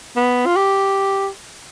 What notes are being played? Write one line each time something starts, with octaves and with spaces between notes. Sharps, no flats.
B3
F4
G4